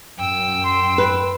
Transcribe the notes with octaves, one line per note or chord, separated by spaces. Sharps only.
F#2 G5 E6
C6
B4